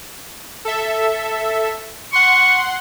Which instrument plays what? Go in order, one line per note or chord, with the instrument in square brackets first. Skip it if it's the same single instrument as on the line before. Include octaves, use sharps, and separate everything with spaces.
[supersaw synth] A4 E5
[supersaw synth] F#5 C6 [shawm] C#6